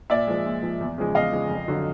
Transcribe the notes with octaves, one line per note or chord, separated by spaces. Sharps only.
A#2 D5 E5
F3 G#3
A#2
F3 G#3
E2
C#3 F3 G#3
E2 D#5 F5
C#3 F3 G#3
F2
D3 F#3